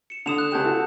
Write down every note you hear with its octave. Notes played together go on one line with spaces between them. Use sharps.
C#7 E7
D3 D#6 E7 F7
F#6
C#2 G4 A5 G6 E7
F#4 A4